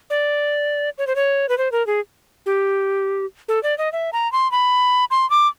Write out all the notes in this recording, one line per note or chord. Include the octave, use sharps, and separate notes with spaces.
D5
C#5
C5
C#5
B4
C5
A#4
G#4
G4
A4
D5
D#5
E5
A#5
C6
B5
C6
D6